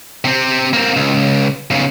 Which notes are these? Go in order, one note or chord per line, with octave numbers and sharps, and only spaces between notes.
C3 C4
A#3 C4
C#2
B1 C#3